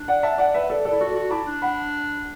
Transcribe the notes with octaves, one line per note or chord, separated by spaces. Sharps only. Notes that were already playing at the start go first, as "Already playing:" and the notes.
Already playing: D4
D5 F#5
E5 A5
D5 F#5
B4 E5
A4 D5
A4 D5
E4
F#4 A4 D5
F#4
E4 A5 D6
D4
F#5 B5